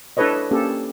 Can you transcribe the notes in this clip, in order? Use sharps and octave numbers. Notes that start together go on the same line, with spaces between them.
D4 E4 A4 B4 C#5 D#5
A#3 C#4 G4 A4